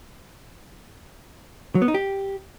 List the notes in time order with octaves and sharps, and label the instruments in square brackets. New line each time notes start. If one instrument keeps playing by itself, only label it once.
[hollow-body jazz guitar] F#3
B3
D#4
G4